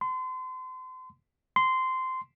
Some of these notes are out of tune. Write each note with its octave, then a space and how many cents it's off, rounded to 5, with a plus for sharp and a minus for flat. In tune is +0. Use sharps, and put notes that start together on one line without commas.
C6 -35
C6 -15